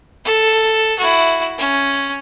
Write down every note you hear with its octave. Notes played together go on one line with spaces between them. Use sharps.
A4
E4 F#4
C#4